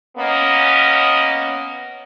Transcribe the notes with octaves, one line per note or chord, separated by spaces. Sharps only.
A#3 B3 C#4 D#5